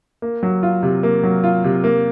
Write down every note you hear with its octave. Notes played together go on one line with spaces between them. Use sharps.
A#3
F#3
F4
C3
A#3
F#3
F4
C3
A#3